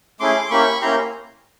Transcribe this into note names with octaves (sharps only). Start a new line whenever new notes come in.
A3 C#4 E4 G#4 C6 D6
C6
A#3 C#4 E4 G4 B5 C#6
A#3 C#4 E4 G4 A#5 C6